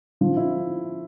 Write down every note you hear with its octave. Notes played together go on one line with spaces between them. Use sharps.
F3
E4